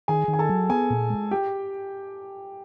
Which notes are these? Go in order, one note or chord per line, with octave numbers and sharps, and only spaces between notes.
D#3 G#4 G#5
D#3
G#5
A4 A5
F#3
B3 G#4 G#5
A#2
G#3
G4 G5